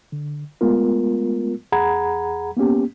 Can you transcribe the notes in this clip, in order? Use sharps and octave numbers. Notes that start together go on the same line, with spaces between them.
D3
G#3 A3 B3 F4 A#4
E2 G#4 F#5 A#5 B5 G#6
A#3 B3 C#4 G4